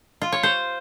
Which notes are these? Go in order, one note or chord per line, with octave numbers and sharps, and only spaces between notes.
F4
C#5
C5